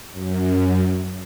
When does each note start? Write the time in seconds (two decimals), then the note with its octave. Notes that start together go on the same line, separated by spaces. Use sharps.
0.12 F#2